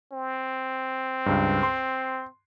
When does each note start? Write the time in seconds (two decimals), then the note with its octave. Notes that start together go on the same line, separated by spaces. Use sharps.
0.12 C4
1.26 C#2 G2
1.63 C6